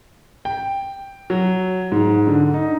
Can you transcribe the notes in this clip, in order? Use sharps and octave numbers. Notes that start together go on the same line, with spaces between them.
G5
F#3
G#2
D3
D#4